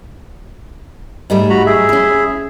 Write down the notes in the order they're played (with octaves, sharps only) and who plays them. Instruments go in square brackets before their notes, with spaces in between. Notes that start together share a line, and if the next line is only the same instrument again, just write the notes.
[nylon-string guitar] G#2 G3 A3
[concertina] F#4 A#5 B5
G#4 E5
[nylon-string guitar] C#4 E4